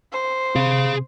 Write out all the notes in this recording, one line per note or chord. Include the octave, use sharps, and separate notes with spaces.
C5
C3 G#4 F5